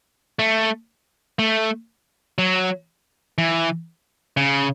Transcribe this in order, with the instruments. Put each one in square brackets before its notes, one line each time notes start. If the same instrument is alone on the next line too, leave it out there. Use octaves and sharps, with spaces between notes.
[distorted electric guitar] A3
A3
F#3
E3
C#3